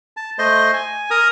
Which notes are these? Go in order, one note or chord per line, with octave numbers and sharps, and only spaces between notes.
A5
A3 C5 D#5 C6
G#5
A#4 A#5 D#6